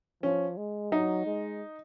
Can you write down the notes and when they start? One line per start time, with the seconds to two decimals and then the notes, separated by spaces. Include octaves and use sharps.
0.23 F3 C#4
0.57 G#3
0.92 F#3 D#4
1.26 G#3